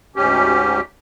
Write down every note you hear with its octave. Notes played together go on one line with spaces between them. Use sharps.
D2 G#2 C#4 G4